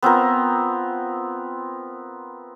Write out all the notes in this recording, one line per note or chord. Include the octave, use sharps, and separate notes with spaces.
B3 C4 F4 A#4